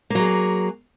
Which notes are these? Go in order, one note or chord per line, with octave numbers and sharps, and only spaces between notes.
F#3 A#3 G#4